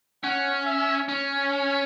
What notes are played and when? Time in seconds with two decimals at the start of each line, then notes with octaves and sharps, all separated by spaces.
0.24 C#4 F#5
0.66 E5
1.08 C#4 C#5